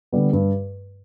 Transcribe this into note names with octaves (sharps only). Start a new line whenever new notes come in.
D3 G3 B3
G2